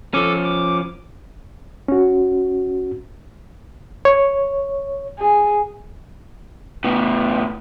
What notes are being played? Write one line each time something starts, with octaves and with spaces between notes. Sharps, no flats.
F3 C#4 A4 D6
D6
C#4 F#4
C#5
G#4
A2 B3